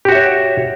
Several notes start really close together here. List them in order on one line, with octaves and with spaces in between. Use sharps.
G4 F#4 E5 C#5